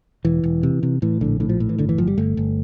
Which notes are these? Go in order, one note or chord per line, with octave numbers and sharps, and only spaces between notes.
E1 E3
E1
C3
C3
A2 E3
A#1 D3
A2 D3
F3
A2
E3
G1 D3
E3
G1 F3
G3
G1 A3
G1